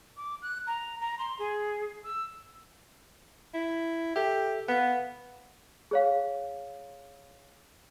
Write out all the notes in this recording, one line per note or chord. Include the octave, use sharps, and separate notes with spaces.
D6
F#6
A#5
A#5
C6
G#4
E6
E4
G4 A4 E5
B3 F5 F#5
G#4 C#5 F5